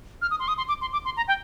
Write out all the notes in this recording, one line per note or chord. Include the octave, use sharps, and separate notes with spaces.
F6
D#6
C6
D#6
C6
D6
C6
D6
C6
A#5
G5